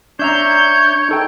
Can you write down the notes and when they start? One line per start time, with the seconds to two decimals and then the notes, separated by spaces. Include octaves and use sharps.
0.19 D4 C#5 E5 A#5 G6
1.09 D#4 A4 G5